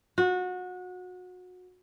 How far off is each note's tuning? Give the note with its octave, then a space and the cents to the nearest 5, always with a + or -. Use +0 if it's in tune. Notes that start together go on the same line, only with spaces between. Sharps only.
F#4 -25